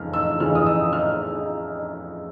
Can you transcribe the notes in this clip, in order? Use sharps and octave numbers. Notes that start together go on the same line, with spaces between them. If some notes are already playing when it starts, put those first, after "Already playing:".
Already playing: F2 C#3 E3 F6
E6
F2 C#3 E3 F6
D#6
E6
F6